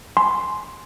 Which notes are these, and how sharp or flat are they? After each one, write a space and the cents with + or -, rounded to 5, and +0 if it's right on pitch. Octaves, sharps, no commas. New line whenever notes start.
G#5 +20 C6 +0